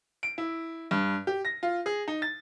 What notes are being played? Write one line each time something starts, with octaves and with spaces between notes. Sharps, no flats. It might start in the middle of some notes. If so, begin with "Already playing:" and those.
D7
E4
G2
G4
A#6
F4
G#4
D#4
A6